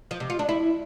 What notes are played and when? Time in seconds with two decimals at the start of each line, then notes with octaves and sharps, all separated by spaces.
0.11 F3
0.20 C3
0.30 F4
0.39 D4
0.49 E4